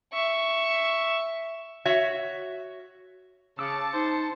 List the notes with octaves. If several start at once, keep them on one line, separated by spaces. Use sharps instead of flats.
E5 C#6
F#4 C#5 E5
C#3 A5 D6 E6 C#7
D#4 C5